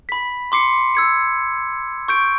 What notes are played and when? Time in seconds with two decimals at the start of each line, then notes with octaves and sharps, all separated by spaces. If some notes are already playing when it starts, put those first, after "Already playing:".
0.09 B5 B6
0.52 C6 D6 C7 C#7
0.95 E6 G#6 C#7
2.08 C#6 G6 D7